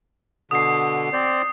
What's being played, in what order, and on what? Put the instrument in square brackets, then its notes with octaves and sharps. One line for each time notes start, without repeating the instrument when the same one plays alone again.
[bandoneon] B2 D3 [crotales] D#6 C7
[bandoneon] C4 C5 D5